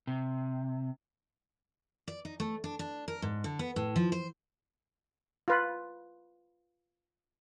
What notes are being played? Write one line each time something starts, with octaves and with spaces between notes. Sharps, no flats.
C3
D5
D#4
A3
D4
D4
A#4
G#2
D3
B3
A2
F3
C5
F4 B4